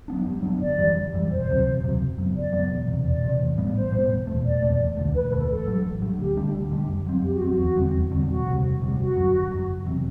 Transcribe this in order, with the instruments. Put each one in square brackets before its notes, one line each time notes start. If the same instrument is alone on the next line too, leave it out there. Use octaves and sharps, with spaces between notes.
[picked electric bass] F#3 B3 D4
G2
F#3 B3 D4
[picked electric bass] G1 [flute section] D5
[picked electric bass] F#2 E3 G3
G1
F#2 E3 G3
[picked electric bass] E1 [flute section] C5
[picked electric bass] D2 C3 F#3
E1
D2 C3 F#3
F#1
F#2 F#3 B3
[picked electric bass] F#1 [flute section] D5
[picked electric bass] F#2 F#3 B3
E1
E2 C3
[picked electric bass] E1 [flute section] D5
[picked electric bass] E2 C3
A1
A2 G3 B3
[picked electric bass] A1 [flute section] C5
[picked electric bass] A2 G3 B3
E1
E2 B2 A3
[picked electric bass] E1 [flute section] D5
[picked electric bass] E2 B2 A3
E1
D2 D3 A3
[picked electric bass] E1 [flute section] B4
[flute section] B4
[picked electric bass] D2 D3 A3
[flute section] A4
[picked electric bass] A1 [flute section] A4
[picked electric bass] G2 F#3
A1
G2 F#3
[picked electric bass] D2 [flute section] G4
[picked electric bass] D3 G3 D4
[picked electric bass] D2 [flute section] G4
[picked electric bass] D3 G3 D4
F#2
F#3 C4
[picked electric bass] F#2 [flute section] G4
[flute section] F#4
[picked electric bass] F#3 C4
[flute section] F#4
[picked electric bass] E2
D3 G3 C4
E2
D3 G3 C4
[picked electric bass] E1 [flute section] F#4
[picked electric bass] D2 C3 G3
E1
D2 C3 G3
[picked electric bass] G1 [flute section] F#4
[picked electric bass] F#2 F#3
G1
F#2 F#3
F#1
E2 C3 F#3